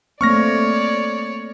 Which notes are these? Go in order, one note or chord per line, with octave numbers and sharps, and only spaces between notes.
A3 A#3 C4 C#5 D5 C#6 F6 A#6